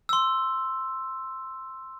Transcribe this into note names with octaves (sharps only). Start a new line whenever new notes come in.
C6 E6